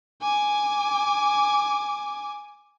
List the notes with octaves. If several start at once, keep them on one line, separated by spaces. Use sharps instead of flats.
G#5 D6